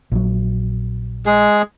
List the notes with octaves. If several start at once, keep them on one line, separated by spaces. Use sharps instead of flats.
A#1 F#3
G#3 G#4